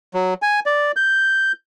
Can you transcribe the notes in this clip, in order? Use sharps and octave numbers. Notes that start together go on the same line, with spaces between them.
F#3
G#5
D5
G6